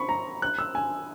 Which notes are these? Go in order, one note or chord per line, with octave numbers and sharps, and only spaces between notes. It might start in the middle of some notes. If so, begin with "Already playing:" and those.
Already playing: B5 C#6
A#5
F#6
E6
G#5